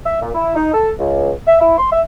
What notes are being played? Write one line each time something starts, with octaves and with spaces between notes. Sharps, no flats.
E5
A#2
E4
D#4
A4
C#2
E5
E4
C6
E5